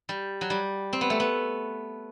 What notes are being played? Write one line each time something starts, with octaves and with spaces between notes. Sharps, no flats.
G3
F#3
G3
C4
B3
A3
B3